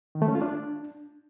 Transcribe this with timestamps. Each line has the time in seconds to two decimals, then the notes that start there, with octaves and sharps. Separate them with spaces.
0.15 D#3
0.22 A3
0.28 C#4
0.35 F4
0.42 D4